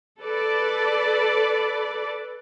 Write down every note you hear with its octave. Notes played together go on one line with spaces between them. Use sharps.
A4 B4 D5